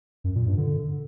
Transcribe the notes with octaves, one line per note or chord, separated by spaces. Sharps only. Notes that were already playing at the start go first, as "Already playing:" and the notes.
F#2
A#2
G2
D3